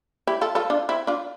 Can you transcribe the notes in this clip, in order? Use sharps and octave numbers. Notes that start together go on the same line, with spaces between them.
E4 G4
F4 A4
F4 A4
D4 F4
C4 E4
D4 F4